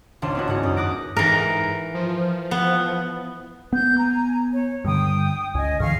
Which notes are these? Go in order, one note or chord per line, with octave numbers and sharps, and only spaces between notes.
G#1 C#2 D4 C6 E7
B3 E4 F#4
G#2 C#4 F#4
F#2 D#6
D6 D#6 F#6 A#6 D7
G#2 E3 A#4
F3
B3
B3 G6
G#5 A#5
C#5
G2 D3 G5 D#6
C#2 D#5 G#5
G#2 D3 E3 F5 C#6 F6